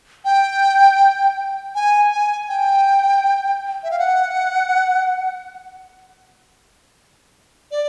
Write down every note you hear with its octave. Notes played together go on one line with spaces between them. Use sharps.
G5
G#5
G#5
G5
E5
F5
F#5
D5